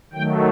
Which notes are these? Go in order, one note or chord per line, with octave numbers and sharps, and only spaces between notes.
D#3 F#3 A3 G5